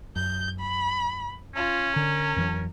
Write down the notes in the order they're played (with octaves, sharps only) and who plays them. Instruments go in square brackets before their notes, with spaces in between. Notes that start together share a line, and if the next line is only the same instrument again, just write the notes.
[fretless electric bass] F#2 [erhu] G6
[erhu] B5
[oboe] C#4 [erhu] F4
[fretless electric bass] D3 [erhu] A#4
[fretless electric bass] F2 E3 F#3